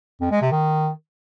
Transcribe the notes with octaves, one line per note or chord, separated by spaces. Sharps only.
F2
G#3
C3
D#3